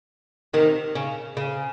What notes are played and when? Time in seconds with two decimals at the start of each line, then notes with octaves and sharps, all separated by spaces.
0.53 C3 D#3
0.95 C#3
1.37 C#3